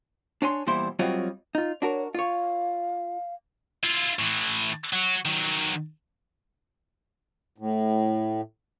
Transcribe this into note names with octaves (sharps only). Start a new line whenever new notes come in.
D4 C#5 G#5 C6
E2 A#2 G3 E4 C5 C6
F#3 G3 C4 F4 C#5 D#5
D#4 F4
D4 F#4 A#4 C#5
F4 C#5 F5
E4 F4
A2 E3
F#3 F#4
D#3 F#3
A2